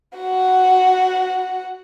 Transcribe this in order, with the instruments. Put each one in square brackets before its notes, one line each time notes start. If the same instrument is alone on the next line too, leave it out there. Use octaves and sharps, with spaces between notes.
[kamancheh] F#4 F#5